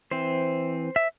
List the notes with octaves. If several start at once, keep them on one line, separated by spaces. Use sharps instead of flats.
E3 C4 C5
E5